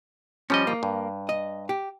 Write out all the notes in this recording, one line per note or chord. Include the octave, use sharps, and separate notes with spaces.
F3 G3 C#4 D#5
A#3
G2
D#5
G4